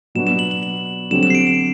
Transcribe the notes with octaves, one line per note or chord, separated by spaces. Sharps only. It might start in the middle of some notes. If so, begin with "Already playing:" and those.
B2 F#3 B3 D4 F#4 E7
E7
F#7
F#7
F#7
D3 F#3 C4 G4 E7
E7
C7
D7
E7